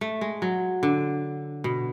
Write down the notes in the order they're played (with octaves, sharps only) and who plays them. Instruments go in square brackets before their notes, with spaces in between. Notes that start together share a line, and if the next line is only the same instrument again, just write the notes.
[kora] A3
G#3
F#3
D3
B2